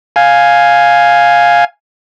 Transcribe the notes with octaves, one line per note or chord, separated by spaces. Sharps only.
F5 G#5